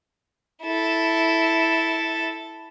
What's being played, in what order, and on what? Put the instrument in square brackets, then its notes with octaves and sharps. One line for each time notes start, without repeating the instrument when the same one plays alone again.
[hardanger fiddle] E4 A4